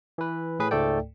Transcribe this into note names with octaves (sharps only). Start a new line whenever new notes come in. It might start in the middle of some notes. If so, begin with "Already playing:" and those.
E3 B4
A2 G#4 B4
C#2 G#2 A3 A4 D5 G5